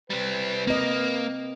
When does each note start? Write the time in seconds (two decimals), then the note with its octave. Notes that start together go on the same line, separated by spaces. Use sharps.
0.10 G3 C4 B4
0.67 A#3 C4 D#5